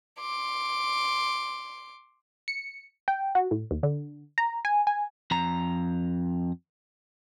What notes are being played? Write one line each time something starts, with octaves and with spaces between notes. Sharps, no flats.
C6 D6
C#7
G5
F#4
A2
D#2
D3
A#5
G#5
G#5
F2 A#5